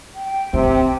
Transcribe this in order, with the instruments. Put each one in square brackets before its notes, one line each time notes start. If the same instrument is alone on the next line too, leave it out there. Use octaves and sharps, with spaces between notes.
[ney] G5
[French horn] C3 [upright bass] C4